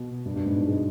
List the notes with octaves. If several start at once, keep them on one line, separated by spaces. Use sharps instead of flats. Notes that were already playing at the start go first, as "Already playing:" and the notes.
Already playing: B2
G2
G2
G#2
B2
G#3